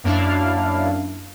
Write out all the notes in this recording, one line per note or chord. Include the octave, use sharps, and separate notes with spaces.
F#2 A#3 D4 E4 F5